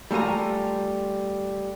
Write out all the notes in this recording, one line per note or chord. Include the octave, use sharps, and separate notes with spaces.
G3 A3 F4 G#5 A#5